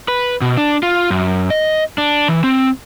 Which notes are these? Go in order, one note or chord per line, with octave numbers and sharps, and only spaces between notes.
B4
B2
D4
F4
F#2
D#5
D4
E3
C4